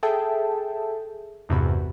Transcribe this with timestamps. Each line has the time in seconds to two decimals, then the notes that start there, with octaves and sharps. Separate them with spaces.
0.03 G#4 A4 E5 G5 A5
1.49 G#1 E2 G2 C3 F#4 B5